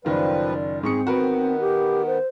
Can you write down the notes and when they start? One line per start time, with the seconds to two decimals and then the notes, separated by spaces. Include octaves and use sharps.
0.05 F#1 D#3 F3 G3 F4 B4
0.41 D5
0.83 G#2 C4 G#4 C#6 C#7
1.07 D#3 B3 F#4 A#4 B4
1.60 G4
2.07 C5